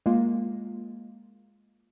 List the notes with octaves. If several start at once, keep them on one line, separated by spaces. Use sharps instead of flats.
G#3 A#3 F4